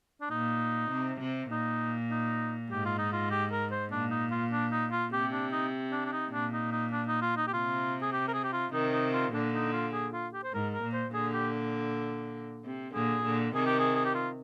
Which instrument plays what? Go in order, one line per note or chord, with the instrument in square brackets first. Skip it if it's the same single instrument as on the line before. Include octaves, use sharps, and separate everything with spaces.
[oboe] D4
[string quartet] A#2 [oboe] D#4
[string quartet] C3
C3
[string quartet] A#2 [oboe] D#4
[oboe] D#4
[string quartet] G#2 [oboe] G4
[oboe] F4
D#4
F4
G4
A#4
C5
[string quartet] A#2 [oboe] D4
[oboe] D#4
F4
D4
D#4
F4
[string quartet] C3 [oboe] G4
[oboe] D4
D#4
D4
D4
D#4
[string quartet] A#2 [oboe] D4
[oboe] D#4
D#4
D4
D#4
F4
D#4
G4
[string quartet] C3 [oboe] F4
[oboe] G#4
G4
A#4
G#4
G4
F4
[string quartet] C3 D#3 [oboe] D#4
[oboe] D#4
F4
[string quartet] A#2 D3 [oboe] D4
[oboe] D#4
F4
G#4
F4
G4
C5
[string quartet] G#2 [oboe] A#4
[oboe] A#4
[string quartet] A#2
[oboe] C5
[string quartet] A#2 D3 [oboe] G#4
[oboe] G4
[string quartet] C3
[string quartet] A#2 D3 [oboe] G#4
[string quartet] A#2 D3
[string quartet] C3 D#3 [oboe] G#4
[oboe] G4
G#4
G#4
G4
F4